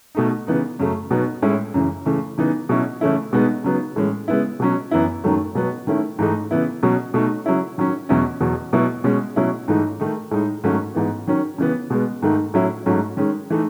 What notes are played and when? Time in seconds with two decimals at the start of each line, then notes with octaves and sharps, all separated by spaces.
0.15 B2 A3 D#4
0.47 C#3 E3 B3 D#4
0.79 F#2 C#3 F#3 A3
1.11 B2 F#3 B3 D#4
1.42 A2 G#3 C#4 E4
1.74 F#2 C#3 E3
2.06 C#3 E3 A3
2.38 C#3 E3 B3 D#4
2.69 B2 F#3 C#4 E4
3.01 C#3 E3 A3 C#4 E4
3.33 B2 G#3 B3 D#4
3.64 C#3 F#3 B3 D#4
3.96 A2 E3 G#3 C#4
4.28 C#3 G#3 B3 E4
4.60 B2 F#3 C#4
4.91 F#2 E3 B3 E4
5.24 F#2 D#3 F#3 A3
5.55 B2 F#3 B3
5.87 D#3 A3 C#4 E4
6.19 G#2 E3 A3 D#4
6.51 C#3 E3 B3 E4
6.83 B2 F#3 C#4
7.14 B2 A3 D#4
7.46 C#3 F#3 C#4 E4
7.78 D#3 F#3 C#4
8.09 E2 B2 F#3 C#4 E4
8.41 E2 B2 F#3
8.73 B2 F#3 B3 E4
9.04 B2 G#3 C#4
9.36 B2 F#3 C#4 E4
9.68 G#2 E3 A3 D#4
10.00 D#3 A3 D#4
10.31 A2 G#3 D#4
10.64 G#2 D#3 F#3 A3 C#4
10.95 G#2 E3 B3
11.27 D#3 F#3 C#4
11.58 C#3 E3 B3
11.90 B2 G#3 B3
12.22 G#2 D#3 A3 D#4
12.54 A2 F#3 C#4 E4
12.86 G#2 F#3 A3 C#4
13.17 D#3 G#3 C#4
13.50 E3 A3 D#4